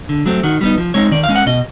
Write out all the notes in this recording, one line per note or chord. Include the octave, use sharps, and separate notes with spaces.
D3
F#3 A3 C4
D#3 F#4
G3 B3 D#4
F3
G#3 C4 D#4 C#5
D#3 D5
F5
G#3 C#4
F#5
B2 D#5